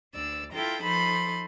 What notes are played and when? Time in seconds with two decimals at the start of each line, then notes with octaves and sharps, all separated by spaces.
0.14 D2 D5 E6
0.52 E4 F4 A4 G5 A#5
0.83 F3 D#4 A4 B5 C6